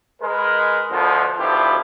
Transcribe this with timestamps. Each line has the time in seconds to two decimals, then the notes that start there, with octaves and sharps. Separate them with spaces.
0.22 G#3 A#4 B4
0.90 D2 B2 F3
1.38 D2 B2 D#3 F3 E4 G4